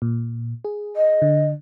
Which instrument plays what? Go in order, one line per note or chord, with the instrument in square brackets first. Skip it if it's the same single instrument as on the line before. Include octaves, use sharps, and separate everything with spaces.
[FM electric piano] A#2
G#4
[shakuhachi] D#5
[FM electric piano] D3